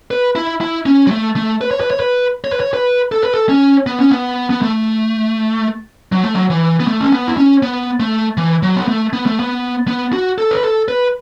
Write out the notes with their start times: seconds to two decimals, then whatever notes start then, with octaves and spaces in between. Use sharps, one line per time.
0.11 B4
0.35 E4
0.61 E4
0.86 C#4
1.07 F#3
1.11 A3
1.36 A3
1.61 B4
1.71 C#5
1.81 B4
1.91 C#5
2.00 B4
2.44 C#5
2.52 B4
2.60 C#5
2.74 B4
3.12 A4
3.22 B4
3.33 A4
3.49 C#4
3.87 B3
3.99 C#4
4.11 B3
4.50 B3
4.62 A3
6.12 F#3
6.23 A3
6.34 F#3
6.50 E3
6.80 B3
6.87 A3
7.01 C#4
7.12 B3
7.27 E4
7.37 C#4
7.63 B3
8.00 A3
8.37 E3
8.63 F#3
8.76 B3
8.88 A3
9.13 B3
9.26 A3
9.40 B3
9.88 B3
10.13 F#4
10.38 A4
10.51 B4
10.63 A4
10.88 B4